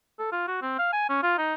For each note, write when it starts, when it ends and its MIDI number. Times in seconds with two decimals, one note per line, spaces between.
0.19 0.30 69
0.32 0.45 65
0.48 0.59 66
0.62 0.74 60
0.79 0.89 77
0.93 1.06 80
1.09 1.20 61
1.23 1.35 65
1.38 1.55 63